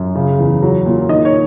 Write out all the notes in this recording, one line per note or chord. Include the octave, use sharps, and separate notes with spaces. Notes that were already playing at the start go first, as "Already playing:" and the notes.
Already playing: F#2
C#3
E2
F#3
A#2
D#3 D#5
C#5